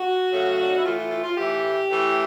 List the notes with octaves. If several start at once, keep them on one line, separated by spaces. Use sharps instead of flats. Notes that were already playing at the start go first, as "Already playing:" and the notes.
Already playing: F#4
C#3 F#3 A3
D4
D#4
E4
A2 E3 A3 F4
F4
F4
F4
A2 E3 A3 G4
A2 E3 A3